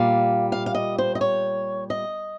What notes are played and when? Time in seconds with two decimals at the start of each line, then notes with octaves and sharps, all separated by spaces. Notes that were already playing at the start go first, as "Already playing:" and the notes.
Already playing: A#2 G3 F5
0.52 F5
0.66 F5
0.75 D#5
0.98 C5
1.15 D#5
1.21 C#5
1.90 D#5